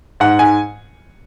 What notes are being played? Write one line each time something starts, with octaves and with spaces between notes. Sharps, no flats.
G#2 F#5
G#2 G#5